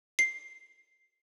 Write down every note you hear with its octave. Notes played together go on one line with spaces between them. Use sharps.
C7